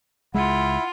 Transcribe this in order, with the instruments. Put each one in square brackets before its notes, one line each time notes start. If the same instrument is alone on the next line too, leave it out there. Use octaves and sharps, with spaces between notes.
[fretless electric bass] C#2 G#3 [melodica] E4 [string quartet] F4 [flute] F#5